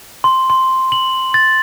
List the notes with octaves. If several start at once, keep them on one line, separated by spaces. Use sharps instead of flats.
C6
C6
F#7
A6